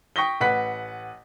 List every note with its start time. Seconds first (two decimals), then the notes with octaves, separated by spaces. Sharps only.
0.16 G5 C#6 D#6 A#6 B6 G7
0.40 A1 B4 F#5 B6